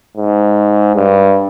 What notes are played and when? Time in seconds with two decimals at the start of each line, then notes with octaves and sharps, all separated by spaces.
0.17 G#2
0.95 G2